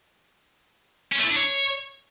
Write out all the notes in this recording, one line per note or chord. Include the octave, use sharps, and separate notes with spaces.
C#4
A3
E4
D4
C#5